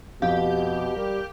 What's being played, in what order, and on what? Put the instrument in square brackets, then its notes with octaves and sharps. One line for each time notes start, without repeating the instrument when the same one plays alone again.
[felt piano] F2 [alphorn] B2 [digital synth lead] G4 [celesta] F5 G6
[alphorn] G3 [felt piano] A#4